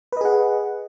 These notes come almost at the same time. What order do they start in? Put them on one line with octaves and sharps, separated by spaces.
B4 D#5 G#4 F#5